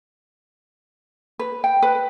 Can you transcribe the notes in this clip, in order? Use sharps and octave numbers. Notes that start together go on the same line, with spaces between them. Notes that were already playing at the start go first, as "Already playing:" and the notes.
B4
G5
B4